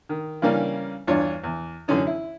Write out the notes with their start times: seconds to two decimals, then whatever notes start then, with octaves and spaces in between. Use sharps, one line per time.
0.09 D#3
0.42 C#3 E3 G3 A#3 C#4 D4
1.07 E2 G2 D4 F4 C#5
1.44 E2
1.88 F#2 D3 E3 C#4 D#4
2.07 E4